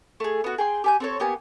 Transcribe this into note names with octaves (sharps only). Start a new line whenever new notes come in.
A3 G#4
B3 F#4
G#4 G5 C6
G4 G#5 G6
C4 A4 C#5
A#3 B3 G4 G#5